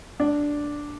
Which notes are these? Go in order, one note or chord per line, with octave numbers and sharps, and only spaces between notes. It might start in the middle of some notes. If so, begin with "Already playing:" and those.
D4